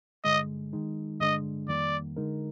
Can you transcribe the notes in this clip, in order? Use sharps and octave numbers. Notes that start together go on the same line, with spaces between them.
G2 D3 G#3 D#5
D#3 G#3 D#4
G2 D3 G#3 D4 D#5
F2 D#3 G3 A#3 D5
D3 G#3 D#4 A#4